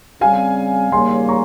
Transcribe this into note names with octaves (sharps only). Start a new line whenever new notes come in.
C#3 G3 C4 F5 G#5
D#2 C#3 G3 A#3 G#5 C6
A#5 C#6